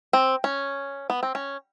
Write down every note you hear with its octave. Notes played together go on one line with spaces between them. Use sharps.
C4
C#4
B3
C4
C#4